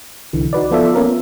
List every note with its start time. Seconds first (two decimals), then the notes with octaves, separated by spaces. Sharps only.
0.33 C2 D3 E3
0.53 D#4 F#4 B4 D5
0.71 F3 B3 F4 A4 D5 E5
0.95 A#3 B3 C#4 F4 A#4